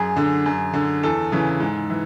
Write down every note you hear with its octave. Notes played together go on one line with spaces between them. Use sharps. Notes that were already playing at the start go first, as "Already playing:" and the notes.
Already playing: F#2 G#4
D3
F#2
D3
E2 A4
C#3 E3
G#2
E3